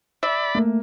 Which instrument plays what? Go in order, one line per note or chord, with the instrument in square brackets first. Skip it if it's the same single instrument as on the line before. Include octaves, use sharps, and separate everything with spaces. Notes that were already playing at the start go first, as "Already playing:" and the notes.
[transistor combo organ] D5 B5 [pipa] E5
[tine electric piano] A3 [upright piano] A#3